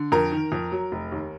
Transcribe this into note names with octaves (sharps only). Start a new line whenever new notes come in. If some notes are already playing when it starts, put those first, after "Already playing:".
Already playing: D3
F2 A#4
D#3
F2
F#3
F1
D#2